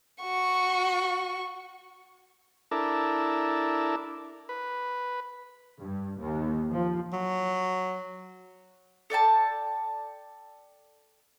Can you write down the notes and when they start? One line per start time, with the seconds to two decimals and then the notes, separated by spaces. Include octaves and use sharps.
0.22 F#4 C#6
2.71 D4 E4 A4 A#4
4.49 B4
5.80 G2
6.20 D#2
6.71 F3
7.13 F#3
9.10 A4 D5 G5 A5